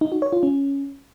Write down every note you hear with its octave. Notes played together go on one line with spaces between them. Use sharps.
D#4
F#4
C#5
F4
C#4